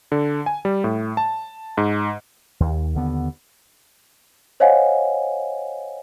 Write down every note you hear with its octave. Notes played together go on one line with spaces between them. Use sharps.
D3
G#5
G3
A2
A5
G#2
D#2
D#2 D3 B3
C5 C#5 D#5 F5 F#5 G#5